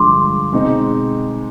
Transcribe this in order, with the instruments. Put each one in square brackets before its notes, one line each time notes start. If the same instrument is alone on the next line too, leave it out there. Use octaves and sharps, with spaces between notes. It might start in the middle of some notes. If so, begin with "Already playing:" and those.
Already playing: [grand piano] G2 D3 F3 G#3 [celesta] C6 D6
[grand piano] B2 G#3 C4 D#4